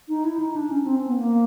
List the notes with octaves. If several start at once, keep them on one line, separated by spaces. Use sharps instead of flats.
D#4
E4
D#4
D4
C#4
C4
B3
A#3